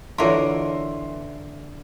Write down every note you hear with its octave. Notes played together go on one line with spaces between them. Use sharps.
D3 E3 D#4 F4 A#4 C#5 E5 C6